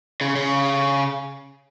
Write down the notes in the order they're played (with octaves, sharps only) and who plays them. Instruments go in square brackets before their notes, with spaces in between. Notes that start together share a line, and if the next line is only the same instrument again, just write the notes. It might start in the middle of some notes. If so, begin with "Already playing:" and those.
[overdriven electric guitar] C#3
C#3